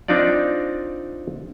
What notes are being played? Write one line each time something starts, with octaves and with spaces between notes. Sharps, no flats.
C4 D4 D#4 F4 D5